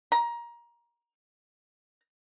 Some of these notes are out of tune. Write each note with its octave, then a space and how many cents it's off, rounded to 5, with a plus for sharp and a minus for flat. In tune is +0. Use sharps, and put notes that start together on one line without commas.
A#5 +20